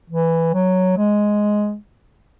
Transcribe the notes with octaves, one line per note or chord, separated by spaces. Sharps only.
E3
F#3
G#3